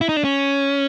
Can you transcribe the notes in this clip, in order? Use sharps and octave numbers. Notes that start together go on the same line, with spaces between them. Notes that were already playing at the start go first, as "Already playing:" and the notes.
E4
D#4
D4
C#4